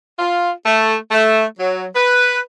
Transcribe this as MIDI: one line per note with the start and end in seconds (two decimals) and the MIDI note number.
0.19 0.51 65
0.66 0.96 57
1.11 1.44 57
1.59 1.85 54
1.96 2.39 71